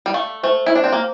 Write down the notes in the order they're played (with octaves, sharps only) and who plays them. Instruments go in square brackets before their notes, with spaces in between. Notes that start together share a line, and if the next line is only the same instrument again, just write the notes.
[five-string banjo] G3
[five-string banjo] A3 [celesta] F5
[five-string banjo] A3 [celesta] C5
[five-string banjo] E4
[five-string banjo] D4 [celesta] C5
[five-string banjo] C4
A#3